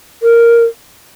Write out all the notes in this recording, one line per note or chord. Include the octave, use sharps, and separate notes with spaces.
A#4